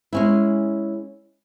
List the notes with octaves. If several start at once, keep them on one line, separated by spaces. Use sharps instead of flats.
G#3 C#4 E4